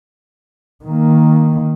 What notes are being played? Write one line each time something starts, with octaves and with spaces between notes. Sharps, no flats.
D#3 A#3